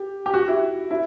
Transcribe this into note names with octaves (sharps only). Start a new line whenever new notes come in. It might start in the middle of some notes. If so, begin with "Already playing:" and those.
Already playing: G4
G4
F#4
E4
E4